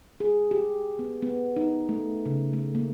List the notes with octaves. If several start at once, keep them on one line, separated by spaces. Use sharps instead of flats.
G#4
G4
B3
B3
D#4
A3
C#3
A3
A#3